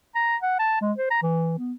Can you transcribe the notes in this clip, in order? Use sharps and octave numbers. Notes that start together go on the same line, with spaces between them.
A#5
F#5
A5
G#3
C5
A#5
E3
B3